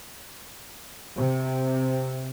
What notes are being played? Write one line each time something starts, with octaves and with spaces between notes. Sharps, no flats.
C3